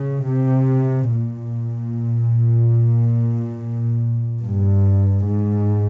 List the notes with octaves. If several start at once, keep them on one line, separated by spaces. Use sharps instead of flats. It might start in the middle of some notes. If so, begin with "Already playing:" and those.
Already playing: C#3
C3
A#2
G2
G#2